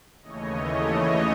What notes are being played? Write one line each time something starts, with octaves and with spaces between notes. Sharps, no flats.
D#2 C#3 E3 A3 C#5 D#5
C#5 D#5